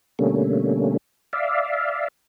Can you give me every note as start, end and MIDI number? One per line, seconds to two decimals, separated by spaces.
0.19 0.97 47
0.19 0.97 50
0.19 0.97 55
0.19 0.97 57
0.19 0.97 58
0.19 0.97 61
1.33 2.08 74
1.33 2.08 76
1.33 2.08 77